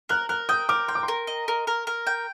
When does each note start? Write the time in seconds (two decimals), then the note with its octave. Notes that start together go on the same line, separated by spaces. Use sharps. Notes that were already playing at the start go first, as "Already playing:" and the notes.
0.09 A#4 F#6
0.29 A#4 F#6
0.49 G5 D#6
0.69 A#4 D6
0.88 G5 C6
0.95 D6
1.03 C6
1.08 A#4
1.27 D#5
1.48 A#4
1.67 A#4
1.87 A#4
2.07 G5